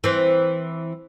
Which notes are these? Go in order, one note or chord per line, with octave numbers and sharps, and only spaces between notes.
E3 C4